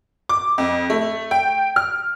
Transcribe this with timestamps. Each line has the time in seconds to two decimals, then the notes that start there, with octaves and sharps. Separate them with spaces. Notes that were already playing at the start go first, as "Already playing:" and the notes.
0.29 D6
0.58 F2
0.90 A3
1.31 G5
1.76 F6